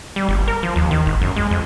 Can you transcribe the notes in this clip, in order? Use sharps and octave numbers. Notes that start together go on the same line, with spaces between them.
G3
G1
A#4
F3
D#2
D#3
G#1
F#2
G#3
F2